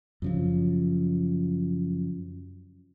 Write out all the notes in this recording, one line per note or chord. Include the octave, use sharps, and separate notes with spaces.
F#2 C#3 F3